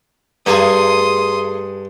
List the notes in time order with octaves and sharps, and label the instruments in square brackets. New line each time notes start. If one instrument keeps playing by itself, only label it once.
[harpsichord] G2 [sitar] A3 G#4 [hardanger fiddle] C6 D#6